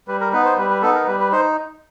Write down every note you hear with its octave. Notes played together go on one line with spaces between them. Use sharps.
G3 B4
A#4
B3 D#4 B4
C5
G3 B4
B4
B3 D#4 A4
A#4
G3 B4
B4
D#4 C5